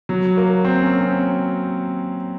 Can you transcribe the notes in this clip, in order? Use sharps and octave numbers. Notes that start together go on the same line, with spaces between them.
F#3
A#3
C4
C#4
C4